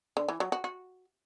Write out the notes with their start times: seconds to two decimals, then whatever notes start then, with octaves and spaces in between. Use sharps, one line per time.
0.17 D3
0.28 E3
0.40 F#3
0.52 F#4
0.64 F#4